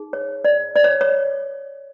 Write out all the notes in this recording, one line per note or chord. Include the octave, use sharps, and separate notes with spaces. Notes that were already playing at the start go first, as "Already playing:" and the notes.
Already playing: D#4 G#4
C#5
D5
D5
C#5
C#5